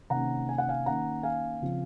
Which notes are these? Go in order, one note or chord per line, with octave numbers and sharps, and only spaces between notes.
C3 D#3 A#3 C#4 F#5 A#5
G#5
F#5
F5 G#5
D#3 A#3 C#4 F#5 A#5
F5 G#5
C#3 F3 C4